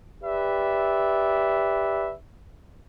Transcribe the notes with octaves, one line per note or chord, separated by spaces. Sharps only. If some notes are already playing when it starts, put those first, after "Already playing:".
G4 B4 D5 E5